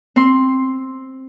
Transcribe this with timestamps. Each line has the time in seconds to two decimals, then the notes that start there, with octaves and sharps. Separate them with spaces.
0.16 C4 C6